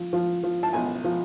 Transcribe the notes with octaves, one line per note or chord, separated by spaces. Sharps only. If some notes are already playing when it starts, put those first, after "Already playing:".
Already playing: F3
F3
F3
A5
B1 G#5
F3